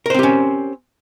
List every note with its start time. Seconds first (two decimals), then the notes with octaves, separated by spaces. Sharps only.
0.06 A#4
0.10 C5
0.14 C4
0.19 G4
0.23 C#4